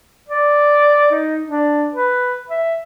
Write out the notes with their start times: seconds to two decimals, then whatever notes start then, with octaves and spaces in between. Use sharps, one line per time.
0.29 D5
1.11 D#4
1.47 D4
1.94 B4
2.50 E5